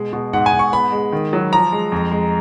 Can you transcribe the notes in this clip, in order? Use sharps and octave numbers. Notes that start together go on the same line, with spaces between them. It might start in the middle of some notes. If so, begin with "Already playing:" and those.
Already playing: B2 G#3
B2
G#2 F#5
G#5
G#2
C#6
B3 B5
G#3
D#3
F#3
F3 A#5
G#3
F2
G#3